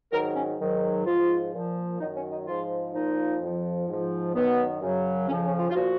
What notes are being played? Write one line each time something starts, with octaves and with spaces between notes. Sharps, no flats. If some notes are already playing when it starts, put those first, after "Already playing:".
G#2 D#3 F#3 A#4
C#4
G#2 D#3 F#3
G#2 F3 F4
A#2 F3
F#2 D#3 F#3 D#4
C#4
D#4
G#2 F3 F4
A#2 F3 D#4
F2 F3
G#2 F3
F#2 D#3 F#3 B3
F#2 C#3 F#3
F2 C#3 F3 C#4
C#4
F4
F4
A#2 F3 F#4